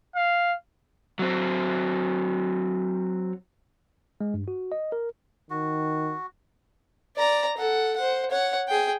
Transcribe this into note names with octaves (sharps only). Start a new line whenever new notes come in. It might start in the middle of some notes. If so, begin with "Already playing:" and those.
F5
F#3 C4
G#3
G2
F#4
D#5
A#4
D#3 F#4
D5 A#5
A4 F#5
C5 F#5
C#5 F#5
G#4 G5